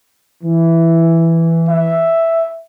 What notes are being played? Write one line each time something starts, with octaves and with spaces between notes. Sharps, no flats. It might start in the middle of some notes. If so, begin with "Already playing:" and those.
E3
E5